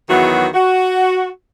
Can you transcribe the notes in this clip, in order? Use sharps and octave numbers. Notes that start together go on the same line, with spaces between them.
E2 D#3 E3 F#3 B3 F#4
F#4